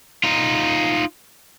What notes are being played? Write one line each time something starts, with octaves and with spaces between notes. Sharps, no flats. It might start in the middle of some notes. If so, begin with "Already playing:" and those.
D#4 F4